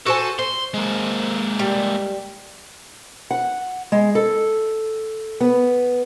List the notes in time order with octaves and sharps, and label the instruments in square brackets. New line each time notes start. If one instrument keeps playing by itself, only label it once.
[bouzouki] F#4 C5 G#5 [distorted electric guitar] A4
[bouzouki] C5 [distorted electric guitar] C6
[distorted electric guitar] G#3 A#3
[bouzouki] G3
[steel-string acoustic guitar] F#5
G#3
A4
B3